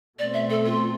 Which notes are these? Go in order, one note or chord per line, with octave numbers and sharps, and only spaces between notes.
B2 A3 C4 D5
E5
A4
F4